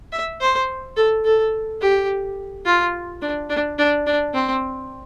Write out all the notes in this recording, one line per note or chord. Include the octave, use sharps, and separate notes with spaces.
E5
C5
A4
A4
G4
F4
D4
D4
D4
D4
C4